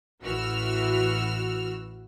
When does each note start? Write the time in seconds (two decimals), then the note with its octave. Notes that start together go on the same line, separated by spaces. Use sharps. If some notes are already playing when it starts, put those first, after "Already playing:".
0.22 A1 E3 F#4 E6 F6